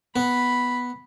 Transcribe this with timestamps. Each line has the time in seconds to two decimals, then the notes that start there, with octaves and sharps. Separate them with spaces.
0.16 B3 B5